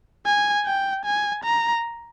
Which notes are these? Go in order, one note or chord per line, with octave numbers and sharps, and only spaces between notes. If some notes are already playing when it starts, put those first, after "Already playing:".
G#5
G5
G#5
A#5